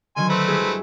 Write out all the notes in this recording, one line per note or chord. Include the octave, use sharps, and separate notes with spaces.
D3 D#3 F#3 G#5 C6
A3 C4 B4
G2 E4 G#4